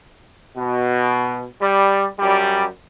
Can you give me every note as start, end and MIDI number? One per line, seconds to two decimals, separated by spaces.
0.57 1.43 47
1.62 2.06 55
2.19 2.64 42
2.19 2.64 55